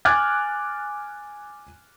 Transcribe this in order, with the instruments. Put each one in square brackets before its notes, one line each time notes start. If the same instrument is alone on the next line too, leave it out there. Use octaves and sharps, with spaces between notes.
[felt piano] G#5 D6 F6 F#6 G#6 A6